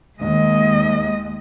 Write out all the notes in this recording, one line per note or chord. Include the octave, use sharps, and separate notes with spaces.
D#2 G#3 D#5